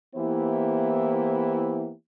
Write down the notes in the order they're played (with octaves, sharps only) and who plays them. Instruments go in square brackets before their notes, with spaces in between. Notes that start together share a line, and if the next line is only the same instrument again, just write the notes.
[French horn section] E3 A#3 B3 E4 G4 C5